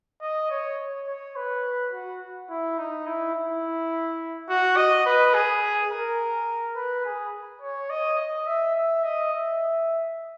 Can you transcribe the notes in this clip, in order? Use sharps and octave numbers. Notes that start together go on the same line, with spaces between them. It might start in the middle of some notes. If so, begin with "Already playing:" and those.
D#5
C#5
C#5
B4
F#4
E4
D#4
E4
E4
F#4
D#5
B4
G#4
A#4
B4
G#4
C#5
D#5
D#5
E5
E5
D#5
E5